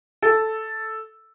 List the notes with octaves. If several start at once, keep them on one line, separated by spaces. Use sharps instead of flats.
A4